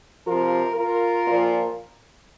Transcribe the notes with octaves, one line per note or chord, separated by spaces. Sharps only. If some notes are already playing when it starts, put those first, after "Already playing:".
C3 F3 F4 A#4
F4 A#4
A#2 F3